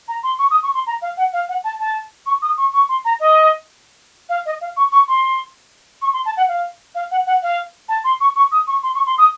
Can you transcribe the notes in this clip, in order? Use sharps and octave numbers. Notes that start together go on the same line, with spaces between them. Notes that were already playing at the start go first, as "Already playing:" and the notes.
A#5
C6
C#6
D#6
C#6
C6
A#5
F5
F#5
F5
F#5
A5
A5
C#6
D#6
C#6
C#6
C6
A#5
D#5
F5
D#5
F5
C#6
C#6
C6
C#6
C6
A5
F#5
F5
F5
F#5
F#5
F5
A5
C6
C#6
C#6
D#6
C#6
C6
C#6
C6
D#6